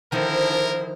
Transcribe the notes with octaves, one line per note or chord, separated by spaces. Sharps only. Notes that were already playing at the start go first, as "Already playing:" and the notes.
D3 D#3 F3 D#4 E4 A#4 C5